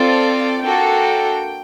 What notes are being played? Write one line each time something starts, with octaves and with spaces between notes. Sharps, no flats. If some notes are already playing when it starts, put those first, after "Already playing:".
Already playing: C4 F4 A4 D5
A#3 D4 F#4 A4 G5